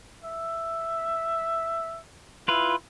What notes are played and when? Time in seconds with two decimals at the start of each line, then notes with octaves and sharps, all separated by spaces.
0.24 E5
2.48 E4 F4 B4